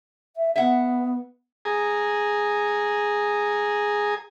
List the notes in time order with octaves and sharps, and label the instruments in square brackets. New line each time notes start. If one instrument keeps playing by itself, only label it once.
[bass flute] E5
[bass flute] B3 [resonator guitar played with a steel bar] E5 F#5
[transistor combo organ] G#4 G#5 A#5 D#6